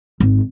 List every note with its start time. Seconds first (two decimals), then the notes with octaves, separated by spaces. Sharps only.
0.20 G#1